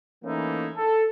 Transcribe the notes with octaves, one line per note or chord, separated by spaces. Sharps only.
E3 A3 A#3 C#4 D#4 E4
A4